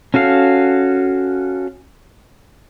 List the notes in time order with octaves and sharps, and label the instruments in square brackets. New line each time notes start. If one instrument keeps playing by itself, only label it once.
[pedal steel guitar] C#4 F#4 A4 F5